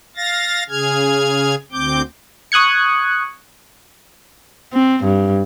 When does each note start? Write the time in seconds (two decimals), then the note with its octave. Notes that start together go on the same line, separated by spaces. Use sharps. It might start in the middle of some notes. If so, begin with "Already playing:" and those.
0.16 F5 A6 A#6
0.69 C#3 G#4 F6 G#6
1.72 D2 C4 D6 G6
2.52 C#6 D#6 F#6 G#6 C#7
4.74 C4
5.04 G2